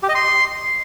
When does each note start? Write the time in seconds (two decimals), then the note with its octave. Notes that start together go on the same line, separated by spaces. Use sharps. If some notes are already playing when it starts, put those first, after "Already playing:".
0.03 G4
0.09 D#5
0.15 C6